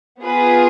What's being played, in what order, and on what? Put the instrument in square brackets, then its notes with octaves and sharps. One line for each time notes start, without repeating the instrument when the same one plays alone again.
[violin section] B3 F4 G#4 B4